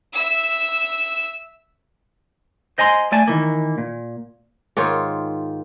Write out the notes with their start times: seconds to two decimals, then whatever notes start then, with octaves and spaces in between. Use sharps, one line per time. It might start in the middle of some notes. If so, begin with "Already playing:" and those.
0.13 E5 E6
2.78 C5 D#5 G#5 A#5 C6
3.12 A3 D5 G#5 A5
3.28 D#3 E3 A#3
3.78 A#2
4.77 G#2 D#3 F4 C#5